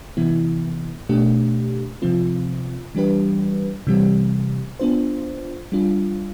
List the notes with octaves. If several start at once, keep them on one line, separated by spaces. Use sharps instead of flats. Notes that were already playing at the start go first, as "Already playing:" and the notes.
C3 E3 B3 E4
B2 A3 D4 G4
C3 F3 C4 F4
E3 G3 D4 G4 B4
C3 E3 G3 C4 G4
B3 D4 F4 C5
G3 D4 F4